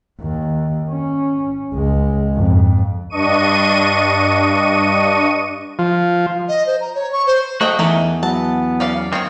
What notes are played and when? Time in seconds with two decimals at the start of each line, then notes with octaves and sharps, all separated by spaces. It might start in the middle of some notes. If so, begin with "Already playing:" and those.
0.20 D#2
0.89 C#4
1.74 C#2 G#3
2.36 F2 G#2
3.10 G2 D4 D#5 C#6 D#7
5.79 F3
6.49 D#5
6.67 C5
6.81 A#5
6.95 C#5
7.13 C#6
7.27 C5
7.61 F#3 A3 F#4 D#5 G5
7.79 E2 E3 A3 D#4 A#4
8.23 F#3 B3 A5
8.80 C#4 D5 F5
9.13 D#3 A#3 C4 C#5